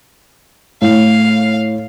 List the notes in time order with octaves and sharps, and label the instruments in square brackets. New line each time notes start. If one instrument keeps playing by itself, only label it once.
[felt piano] A2 [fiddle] F5